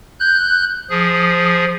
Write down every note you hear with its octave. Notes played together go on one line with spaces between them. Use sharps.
F#6 G6
F3 G#4